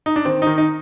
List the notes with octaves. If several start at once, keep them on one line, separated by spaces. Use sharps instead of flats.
D#4
D4
D#3 C4
D#3 D#4
D#4